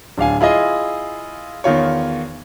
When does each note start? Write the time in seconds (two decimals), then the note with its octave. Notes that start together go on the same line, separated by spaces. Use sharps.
0.18 D1 D4 F5 G#5
0.41 E4 F4 G#4 D#5
1.64 E2 D#3 F4 C#5